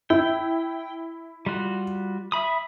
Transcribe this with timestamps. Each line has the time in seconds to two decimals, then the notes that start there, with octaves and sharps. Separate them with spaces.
0.10 E4 G5
1.46 G3 F4 F#4
2.32 E5 B5 D#6